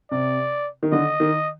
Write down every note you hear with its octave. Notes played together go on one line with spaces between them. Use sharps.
C3 D5
D#3
D3 D#5
D#3